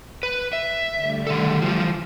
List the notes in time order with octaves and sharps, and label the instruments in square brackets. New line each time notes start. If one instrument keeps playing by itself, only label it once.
[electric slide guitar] B4
E5
[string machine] D3 G3 A3
[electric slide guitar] D#3 A4
E3 F3